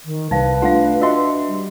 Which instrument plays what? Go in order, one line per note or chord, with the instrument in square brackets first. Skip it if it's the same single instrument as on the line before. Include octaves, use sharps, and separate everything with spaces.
[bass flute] D#3
[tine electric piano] C2 [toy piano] D#4 F5 G5 [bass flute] B4
[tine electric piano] A3 D4 F4 [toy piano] F5 F#5
[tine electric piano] D4 E5 C6 [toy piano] F#4 D#5 G5
[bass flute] G3